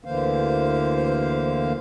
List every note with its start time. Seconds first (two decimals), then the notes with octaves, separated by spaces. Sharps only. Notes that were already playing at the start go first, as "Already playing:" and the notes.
0.05 D2 D3 E3 A#3 C5 F5